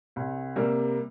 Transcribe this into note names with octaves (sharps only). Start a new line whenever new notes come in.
C2
C3 G3 A#3